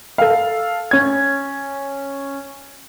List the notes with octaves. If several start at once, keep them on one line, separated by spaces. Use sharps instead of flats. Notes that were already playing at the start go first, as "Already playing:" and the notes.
A4 F5
C#4 G#6